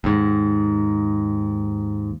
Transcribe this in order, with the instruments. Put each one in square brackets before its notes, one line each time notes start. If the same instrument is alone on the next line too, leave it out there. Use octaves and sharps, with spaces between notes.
[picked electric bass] D#2 G#2